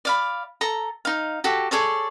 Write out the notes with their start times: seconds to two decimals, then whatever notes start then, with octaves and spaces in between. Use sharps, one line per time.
0.05 D5 F5 B5
0.61 A4 A#5
1.05 D#4 F5
1.44 F#4 G4 A4
1.71 G#4 A4 C#5 D5